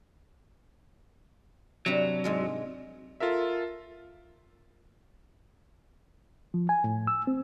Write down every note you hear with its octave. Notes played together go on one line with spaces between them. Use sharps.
G2 C3 F#3
G#2 G#3 F4
F4 A4 A#4 E5
F3
G#5
A2
E6
C4